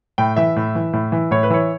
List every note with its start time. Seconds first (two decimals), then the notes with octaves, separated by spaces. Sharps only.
0.18 A2 G5
0.36 E3 E5
0.56 A2
0.75 E3
0.93 A2
1.12 E3
1.31 A2 C#5
1.43 B4
1.50 E3 C#5